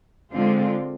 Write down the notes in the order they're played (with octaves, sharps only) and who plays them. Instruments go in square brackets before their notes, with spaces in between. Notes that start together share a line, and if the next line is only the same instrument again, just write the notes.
[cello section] D3 G#3 C4 F4